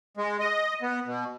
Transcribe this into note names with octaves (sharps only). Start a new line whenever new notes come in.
G#3
D#5
B3
B2